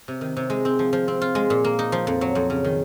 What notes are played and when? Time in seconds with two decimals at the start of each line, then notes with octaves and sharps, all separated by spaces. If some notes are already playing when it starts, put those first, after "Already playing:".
0.08 C3
0.21 D#3
0.37 C3
0.50 G#3
0.65 C4
0.79 F3
0.93 F3
1.08 C4
1.22 F4
1.35 G#3
1.50 A#2
1.64 A#3
1.79 D#4
1.92 F3
2.07 F2
2.21 F#3
2.35 F2
2.50 C#3
2.64 D#3